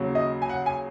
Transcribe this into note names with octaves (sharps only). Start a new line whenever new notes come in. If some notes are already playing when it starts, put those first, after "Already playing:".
Already playing: D#2 C#3 F#3
D#5
G#5
F#5
G#5